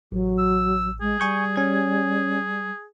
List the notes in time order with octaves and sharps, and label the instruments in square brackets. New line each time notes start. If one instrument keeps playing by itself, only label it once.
[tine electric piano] A1 [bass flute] F#3
[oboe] E6
[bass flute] G#3 [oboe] G#4
[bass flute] G3 [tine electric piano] G#5 C#6 G6
[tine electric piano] C#4 G#6